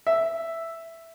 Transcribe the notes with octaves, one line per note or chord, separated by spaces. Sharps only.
E5